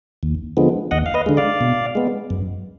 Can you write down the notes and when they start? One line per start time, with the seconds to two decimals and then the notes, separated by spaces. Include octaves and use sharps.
0.23 D#2
0.57 D3 F3 G#3 B3
0.91 D#2 D#5 F#5
1.06 F5
1.14 B4 D#5
1.26 D3 G#3
1.37 D5 F5
1.61 B2
1.95 G#3 B3
2.30 F#2